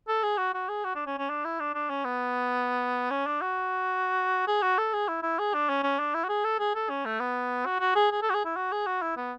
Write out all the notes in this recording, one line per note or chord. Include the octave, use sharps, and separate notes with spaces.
A4
G#4
F#4
F#4
G#4
F#4
D4
C#4
C#4
D4
E4
D4
D4
C#4
B3
C#4
D4
F#4
G#4
F#4
A4
G#4
E4
E4
G#4
D4
C#4
C#4
D4
E4
F#4
G#4
A4
G#4
A4
C#4
A3
B3
F#4
F#4
G#4
G#4
A4
F#4
G#4
E4
F#4
G#4
F#4
E4
B3